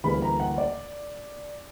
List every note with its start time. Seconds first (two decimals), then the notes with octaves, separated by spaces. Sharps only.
0.04 D2 C#3 E3 G3 A#3 B5
0.22 A#5
0.40 F#5
0.58 D5